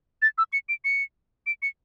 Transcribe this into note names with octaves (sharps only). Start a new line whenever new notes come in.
A6
E6
C#7
D7
C#7
D7
C#7